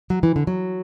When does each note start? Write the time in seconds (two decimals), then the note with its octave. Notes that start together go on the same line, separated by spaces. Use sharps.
0.10 F#3
0.23 E3
0.36 D3
0.47 F#3